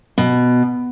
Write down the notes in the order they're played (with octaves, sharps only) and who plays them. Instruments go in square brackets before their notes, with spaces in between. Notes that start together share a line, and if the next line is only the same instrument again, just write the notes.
[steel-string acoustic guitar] B2